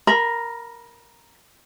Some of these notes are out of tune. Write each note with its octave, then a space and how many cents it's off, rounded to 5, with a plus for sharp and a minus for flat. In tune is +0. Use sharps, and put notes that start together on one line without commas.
A#4 +0 B5 -25